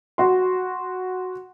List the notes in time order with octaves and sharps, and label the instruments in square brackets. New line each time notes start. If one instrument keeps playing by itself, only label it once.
[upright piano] F#4 C6